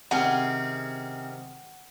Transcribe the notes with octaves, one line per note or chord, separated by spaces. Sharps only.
C3 D#3 C4 C#4 G#4 F#5